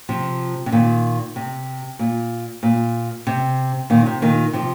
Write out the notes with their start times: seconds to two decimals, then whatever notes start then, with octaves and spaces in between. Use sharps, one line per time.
0.09 C3 F3
0.66 C3
0.72 A#2 D#3
1.36 C3
1.99 A#2
2.63 A#2
3.27 C3
3.90 A#2 D#3
4.06 C3
4.22 A#2 D#3
4.53 C3 F3